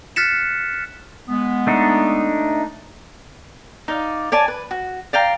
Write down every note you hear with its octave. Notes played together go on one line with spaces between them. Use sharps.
F6 F#6 A6 B6 C#7 E7
G#3 B3
A3 D4 D#4
D#4 D5 F5
C#5 D5 G#5 A5
B4
F#4
D5 F5 G5 A#5